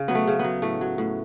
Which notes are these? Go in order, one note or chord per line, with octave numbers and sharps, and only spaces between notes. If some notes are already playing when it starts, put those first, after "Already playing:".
Already playing: C#3
F#3 B3
A3
C#3
F#3 B3
A2 A3
F#3
A2